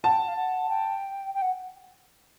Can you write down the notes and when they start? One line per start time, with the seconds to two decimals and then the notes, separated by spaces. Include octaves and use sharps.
0.04 F#5 A5
0.11 G5
0.19 F#5
0.28 F5
0.36 F#5
0.69 G5
1.34 G5
1.42 F#5